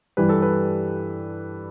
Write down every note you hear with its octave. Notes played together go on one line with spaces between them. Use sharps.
G2 E3 G3 B4
A4
B4